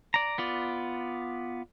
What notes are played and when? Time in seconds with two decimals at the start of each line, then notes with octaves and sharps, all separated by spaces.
0.14 D5 A#5
0.38 B3 F4 D5